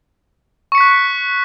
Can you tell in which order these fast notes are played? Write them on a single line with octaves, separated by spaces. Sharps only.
C#6 C#7 B6 F#6